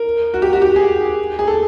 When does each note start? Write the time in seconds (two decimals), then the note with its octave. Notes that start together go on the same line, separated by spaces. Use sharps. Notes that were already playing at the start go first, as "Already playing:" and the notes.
Already playing: A#4
0.34 F#4
0.42 G4
0.53 F#4
0.62 G4
0.76 G#4
1.39 G#4
1.47 A4